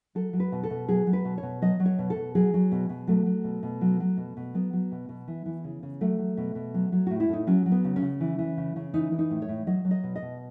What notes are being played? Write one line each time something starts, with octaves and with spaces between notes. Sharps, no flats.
F#3 A4
F#3
B4
B2
A4
B2
F#3 G#4
F#3
B4
B2
C#5
B2
F#3 D#5
F#3
C#5
B2
A4
B2
F#3 G#4
F#3
B2
B2
F#3 A3
F#3
B2
B2
F#3
F#3
B2
B2
F#3 B3
F#3
B2
B2
E3
E3
C#3
C#3
F#3 A3
F#3
B2
B2
F#3
F#3
A2 F#4
E4
A2 D#4
F#3 C#4
F#3
B3
C#3
C#4
C#3
E3
E3
C#3
C#3
E3 D#4
E3
D#4
A2
C#5
A2
F#3 D#5
F#3
D#5
B2
D#5
B2